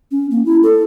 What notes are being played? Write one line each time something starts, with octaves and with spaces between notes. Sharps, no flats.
C#4
A#3
E4
A4